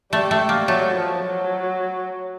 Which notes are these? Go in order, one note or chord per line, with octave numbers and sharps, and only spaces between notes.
G3 A3
A3
A#3
F#3 A3
F3
F#3